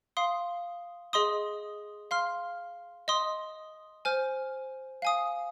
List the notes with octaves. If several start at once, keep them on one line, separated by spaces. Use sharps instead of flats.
F5 C6 D#6
G#4 D#5 C6 D#6
F5 C6 F6
D#5 C6 D#6
C5 G#5 F6
F5 G#5 D#6